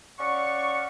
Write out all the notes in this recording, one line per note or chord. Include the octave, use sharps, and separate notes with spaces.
C#4 D5 F5 F#5 C#6